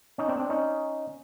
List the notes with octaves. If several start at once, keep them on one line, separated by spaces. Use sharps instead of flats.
C#4 D#4
C4 D4
C4 D4
C#4 D#4